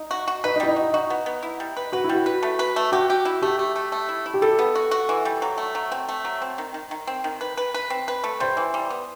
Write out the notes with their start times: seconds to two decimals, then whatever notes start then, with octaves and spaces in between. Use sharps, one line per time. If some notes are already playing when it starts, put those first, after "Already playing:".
Already playing: D#4
0.11 F#4
0.27 F#4
0.44 D#4 B4
0.56 D#4
0.60 G3 E4
0.68 D#4
0.76 F#4
0.81 D#4
0.93 D#4 F#4
1.10 B3
1.26 B3
1.43 E4
1.60 G3
1.77 B4
1.92 F#4 B4
2.04 E4
2.09 G3
2.15 F#4
2.26 B4
2.43 A3
2.59 B4
2.76 A3
2.92 F#4 G4
3.10 G4
3.25 E4
3.42 A3 G4
3.59 A3
3.76 A3
3.92 A3
4.09 E4
4.26 E4
4.34 G4
4.42 G3 A4
4.59 B3
4.75 F#4
4.91 F#4
5.09 E3
5.25 G3
5.42 F#3
5.58 A3
5.75 F#3
5.92 C4
6.08 A3
6.25 F#3
6.42 C4
6.58 D#3
6.74 D#3
6.91 D#3
7.07 C4
7.24 D#3
7.41 B4
7.57 B4
7.74 B4
7.90 C4
8.08 B4
8.24 A3
8.40 G3 C5
8.57 E3
8.74 G3
8.90 B3